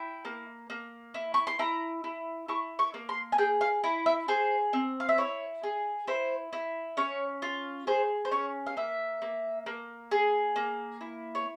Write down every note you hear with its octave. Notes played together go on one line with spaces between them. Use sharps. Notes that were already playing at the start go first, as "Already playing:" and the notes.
Already playing: E4 G5
A#3
A#3
E4
C#6
C6
E4 A#5
E4
E4 C#6
C#6
A#3
C6
G#5
G#4 G5
F5
E4
E5
G#4 C5
C4
F5
E5
E4 C#5
G#4
E4 C5
E4
C#4 C#5
F4
G#4 C5
C5
C#4 C#5
F5
A#3 E5
A#3
A#3
G#4
A#3
E4
C#5